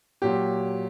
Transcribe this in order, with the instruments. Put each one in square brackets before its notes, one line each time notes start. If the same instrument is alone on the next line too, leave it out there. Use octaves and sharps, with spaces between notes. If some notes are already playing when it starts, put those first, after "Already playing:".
[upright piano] A#2 F#3 G4